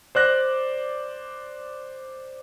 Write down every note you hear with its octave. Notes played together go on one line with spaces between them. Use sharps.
C5 D5 F#6 A#6